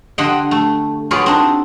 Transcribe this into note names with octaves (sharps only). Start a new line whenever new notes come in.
D3 G4 C5 D#5 F#5 G5
A3
F4 F#4 G#4 B4 C#5 D5
C4 D4 D#4